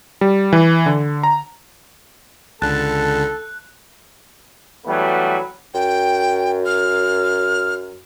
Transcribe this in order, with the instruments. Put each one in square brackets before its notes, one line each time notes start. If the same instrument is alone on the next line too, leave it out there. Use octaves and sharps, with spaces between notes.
[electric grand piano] G3
E3
D3
A#5
[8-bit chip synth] C#2 D3 [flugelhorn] A4 [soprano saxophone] A5 [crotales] F#6
[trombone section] E3 F#3 G3 A3 B3
[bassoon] F#2 [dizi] G5
[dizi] F6